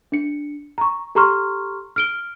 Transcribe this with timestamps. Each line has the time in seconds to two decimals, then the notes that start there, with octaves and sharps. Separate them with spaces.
0.12 D4 C#7
0.78 A#5 C#6
1.15 G4 A4 A#5 C6 C#6 F6
1.96 F6 D7 G7